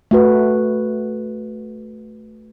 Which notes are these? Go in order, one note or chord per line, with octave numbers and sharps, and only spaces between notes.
A3 F#4 B4